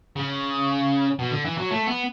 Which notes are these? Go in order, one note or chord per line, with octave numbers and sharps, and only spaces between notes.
C#3
B2
D3
E3
F#3
A3
B3